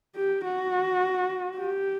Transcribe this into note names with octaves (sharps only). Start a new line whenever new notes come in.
G4
F#4
G4